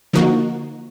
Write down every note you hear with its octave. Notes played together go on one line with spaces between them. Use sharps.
D3 F3 A#3 D#4 F#4